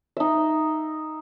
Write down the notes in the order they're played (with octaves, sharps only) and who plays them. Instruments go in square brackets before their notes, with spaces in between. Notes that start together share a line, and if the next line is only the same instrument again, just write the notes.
[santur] D#4 E5